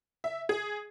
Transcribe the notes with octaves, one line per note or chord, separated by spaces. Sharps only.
E5
G#4